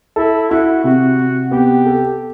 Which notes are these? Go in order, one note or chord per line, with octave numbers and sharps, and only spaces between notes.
E4 A4
E4 F#4
C3 F#4
C3
B3 G4
A4